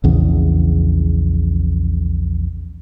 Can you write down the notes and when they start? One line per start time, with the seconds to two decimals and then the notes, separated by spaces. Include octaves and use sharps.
0.04 A#1 E2 C#3